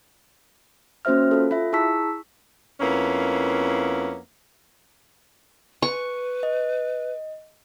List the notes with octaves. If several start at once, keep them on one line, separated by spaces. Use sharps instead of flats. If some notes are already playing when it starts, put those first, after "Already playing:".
A#3 C#4 F#4 C5 E5 F6
F4 A4
F4 E5
E4 G#4 A5 C#6 E6 B6
F2 A#3 B3 C#4 E4
B4 C#6
D#5